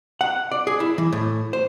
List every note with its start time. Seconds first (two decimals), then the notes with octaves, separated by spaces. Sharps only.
0.21 F#5
0.52 D5
0.67 G#4
0.80 E4
0.98 E3
1.12 A2
1.53 C5